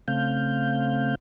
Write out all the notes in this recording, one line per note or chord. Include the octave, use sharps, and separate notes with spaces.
C#3 A3 C4 F5 G6